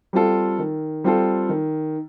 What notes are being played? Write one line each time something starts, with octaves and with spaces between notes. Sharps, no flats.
G3 C4 F4 A4
D#3
G3 C4 F4 A4
D#3